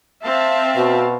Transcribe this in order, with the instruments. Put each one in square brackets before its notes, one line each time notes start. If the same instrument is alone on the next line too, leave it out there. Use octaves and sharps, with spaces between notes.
[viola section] C4 F5 A5 [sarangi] E5
[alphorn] B2 [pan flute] F#4